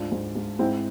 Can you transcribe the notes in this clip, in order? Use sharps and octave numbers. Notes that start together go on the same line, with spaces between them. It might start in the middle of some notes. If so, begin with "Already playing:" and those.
Already playing: D2 G#2 D4 F4
G#2
G#2
G#2 C4 E4